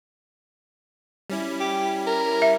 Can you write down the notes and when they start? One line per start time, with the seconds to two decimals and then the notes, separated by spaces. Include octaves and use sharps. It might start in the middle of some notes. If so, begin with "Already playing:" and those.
1.30 G3 C#4 E4
1.60 G4
2.07 A#4
2.42 E5